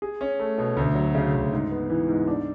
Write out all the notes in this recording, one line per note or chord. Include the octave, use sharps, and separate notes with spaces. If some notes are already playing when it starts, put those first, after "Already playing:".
G#4
C#4
A3
B2
D2
F#3
C#3
D2
G#2
B3
E3
G#2
D4